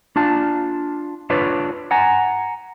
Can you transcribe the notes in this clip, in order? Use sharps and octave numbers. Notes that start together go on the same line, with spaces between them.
D4 F4 A5
D4 F4 B4 C#5 D5
F#5 G#5 A#5